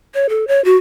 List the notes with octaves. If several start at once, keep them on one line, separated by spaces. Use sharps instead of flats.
C#5
A4
C#5
F#4